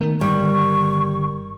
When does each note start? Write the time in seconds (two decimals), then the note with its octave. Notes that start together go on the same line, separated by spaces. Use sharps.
0.01 D#3 A3 B3 A#4
0.21 G1 G3 C#6